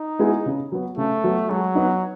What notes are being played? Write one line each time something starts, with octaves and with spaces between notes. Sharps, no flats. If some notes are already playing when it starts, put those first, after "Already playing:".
Already playing: D#4
G#3 B3 E4 G#4
C#3
F#3 B3
C#3 A3
F#3 B3
F#3 G#3
B3 D#4